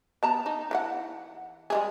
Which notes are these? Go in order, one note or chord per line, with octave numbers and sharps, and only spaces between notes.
B3 A5 A#5
D#4
E3 F4 F#5
G3 G#3 G#4